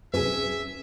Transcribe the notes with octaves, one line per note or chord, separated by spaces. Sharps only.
C2 F#2 C#4 G#4 B4 E5